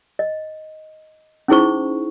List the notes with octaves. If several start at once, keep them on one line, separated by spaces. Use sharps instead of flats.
D#5
C#4 D#4 E4 G#4 C5 C#6